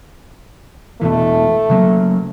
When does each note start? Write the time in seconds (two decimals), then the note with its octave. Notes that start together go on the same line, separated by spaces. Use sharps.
1.01 E2 B2 E3 A3
1.70 C#3 F#3 A#3